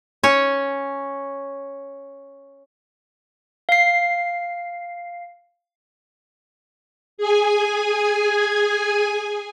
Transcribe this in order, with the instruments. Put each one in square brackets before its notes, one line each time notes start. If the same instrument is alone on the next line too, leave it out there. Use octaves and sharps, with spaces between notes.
[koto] C#4 C#5
[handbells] F5 C7
[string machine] G#4 G#5